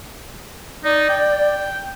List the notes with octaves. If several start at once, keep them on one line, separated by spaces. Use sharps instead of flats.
D#4 D5
G5